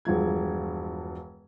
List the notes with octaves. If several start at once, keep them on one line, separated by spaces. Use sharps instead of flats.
E1 G2 F3 G#6